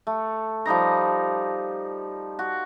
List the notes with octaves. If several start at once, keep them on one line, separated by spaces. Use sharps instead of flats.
A3
F3 G3 D#4 A#5
F#4